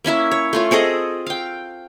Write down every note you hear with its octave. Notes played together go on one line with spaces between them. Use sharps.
A#3 C#4 E4 E5
C#5
A3 F4 C#5
C4 G#4 A4 D#5
F5 G5